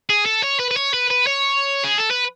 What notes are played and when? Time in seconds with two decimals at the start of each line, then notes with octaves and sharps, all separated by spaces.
0.10 G#4
0.26 A4
0.43 C#5
0.60 B4
0.71 B4
0.77 C#5
0.94 B4
1.10 B4
1.27 C#5
1.84 G#4
1.98 A4
2.11 B4